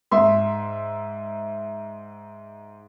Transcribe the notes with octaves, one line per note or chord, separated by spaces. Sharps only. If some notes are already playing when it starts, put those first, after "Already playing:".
G#2 E5 C6